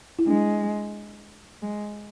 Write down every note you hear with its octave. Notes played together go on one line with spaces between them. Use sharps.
E4
G#3 D4
G#3